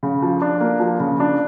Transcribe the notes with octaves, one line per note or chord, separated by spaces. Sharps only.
C#3
F3
D4
A#3
F3
C#3
D4